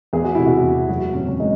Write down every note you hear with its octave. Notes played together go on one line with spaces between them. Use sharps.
E2 G#4
F#4
C3 E4
F#4
E1
F#2 F#4
C#3 C#4
C4
C#4
G#3 D#4